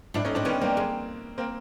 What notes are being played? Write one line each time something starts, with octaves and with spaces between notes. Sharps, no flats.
A2 D4 E4
A2 C#4 D#4
A2 C4 D4
D#3 B3 C#4
G3 A#3 C4
G#3
A#3 C4